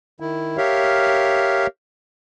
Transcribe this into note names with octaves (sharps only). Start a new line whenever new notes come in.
D#3 E4
G4 A#4 C#5 E5 F5